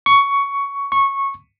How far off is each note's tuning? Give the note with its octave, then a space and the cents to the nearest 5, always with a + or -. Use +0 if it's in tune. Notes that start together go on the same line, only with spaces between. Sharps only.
C#6 +10
C#6 -15